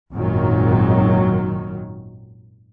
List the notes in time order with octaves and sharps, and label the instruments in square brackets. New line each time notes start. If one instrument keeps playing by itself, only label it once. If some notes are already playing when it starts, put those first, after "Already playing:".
[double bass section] G#1 F#2 A#2 D#3 F#3